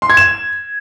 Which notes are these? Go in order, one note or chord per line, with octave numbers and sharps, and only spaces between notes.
C6
G#6
E7